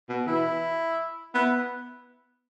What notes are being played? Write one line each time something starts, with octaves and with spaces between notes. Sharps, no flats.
B2
E3 E4
B3 E4